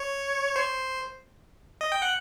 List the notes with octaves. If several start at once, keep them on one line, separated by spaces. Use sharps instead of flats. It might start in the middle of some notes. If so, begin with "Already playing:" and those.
Already playing: C#5
C5
D#5
G5
F#5